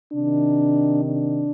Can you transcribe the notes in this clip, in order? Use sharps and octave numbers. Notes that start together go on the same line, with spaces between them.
C3 D#3 D4
D4